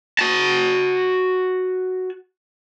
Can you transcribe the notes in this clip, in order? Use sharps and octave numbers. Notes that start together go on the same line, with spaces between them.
F#4 A5